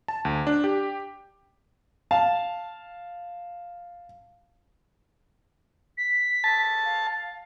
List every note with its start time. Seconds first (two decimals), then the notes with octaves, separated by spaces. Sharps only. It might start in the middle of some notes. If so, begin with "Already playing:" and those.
0.08 A5
0.25 D2
0.47 D4
0.64 G4
2.11 F5 A5
5.98 B6
6.44 A5
6.85 F5